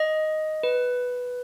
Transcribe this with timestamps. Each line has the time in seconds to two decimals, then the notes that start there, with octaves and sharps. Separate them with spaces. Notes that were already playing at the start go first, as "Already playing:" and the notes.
Already playing: D#5
0.63 B4